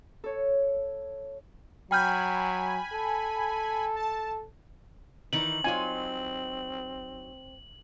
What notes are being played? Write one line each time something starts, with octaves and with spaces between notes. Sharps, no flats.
A4 C#5
F#3 G5 G#5 B5 F6 G6
A4
A5
D#3 E3 D#4 F#7
F#3 C4 D#4 F4 G#5